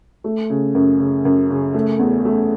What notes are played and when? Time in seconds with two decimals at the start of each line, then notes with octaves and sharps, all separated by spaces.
0.24 A3
0.50 C#3
0.75 F#2
0.99 C#3
1.25 F#2
1.50 C#3
1.74 A3
1.99 E2
2.25 A3